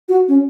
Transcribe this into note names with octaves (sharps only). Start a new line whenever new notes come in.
F#4
C#4